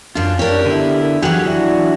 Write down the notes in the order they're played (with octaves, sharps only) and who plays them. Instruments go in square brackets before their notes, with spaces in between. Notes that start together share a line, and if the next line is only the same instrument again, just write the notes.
[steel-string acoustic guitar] F#2 D4 [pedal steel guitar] F4
[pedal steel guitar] C#4 D4 [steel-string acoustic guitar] G4 A#4
[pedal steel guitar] D3 B3 E4
[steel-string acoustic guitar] E3 F#3 [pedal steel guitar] G4 G#4 F#5
[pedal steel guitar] D4 E4 F#4